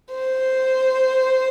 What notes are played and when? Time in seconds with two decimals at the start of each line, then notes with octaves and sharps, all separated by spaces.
0.14 C5